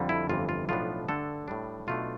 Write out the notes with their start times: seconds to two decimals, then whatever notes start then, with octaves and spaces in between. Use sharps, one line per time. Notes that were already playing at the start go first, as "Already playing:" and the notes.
Already playing: F2 D3 G3
0.09 E4
0.29 G1 F2 E3 F4
0.49 F4
0.69 B1 A2 F3 B3 D4 F4
1.08 G2 D3 A3 D4 A4
1.48 A2 G3 D4
1.87 B1 B2 A3 D4 F4